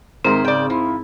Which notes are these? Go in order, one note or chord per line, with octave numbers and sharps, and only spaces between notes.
G#2 D#3 C4 E4 A#4 C5
C#3 D5 G5
F3 E4